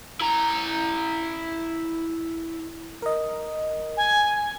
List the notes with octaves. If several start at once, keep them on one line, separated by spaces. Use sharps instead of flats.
E4 A#5
A#4 D#5
G#5